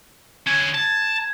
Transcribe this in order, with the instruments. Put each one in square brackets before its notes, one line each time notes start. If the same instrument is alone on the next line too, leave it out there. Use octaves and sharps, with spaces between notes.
[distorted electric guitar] D3 C#4 [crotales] G#6
[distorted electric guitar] A5